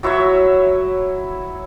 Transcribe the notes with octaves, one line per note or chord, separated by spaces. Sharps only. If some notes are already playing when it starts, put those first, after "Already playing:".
F#3 E4 C#5 E5